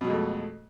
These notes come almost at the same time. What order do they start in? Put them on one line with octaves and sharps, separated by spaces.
B2 F#3 G#3 F2 A3